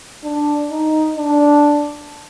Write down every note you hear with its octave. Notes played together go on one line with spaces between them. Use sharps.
D4
D#4
D4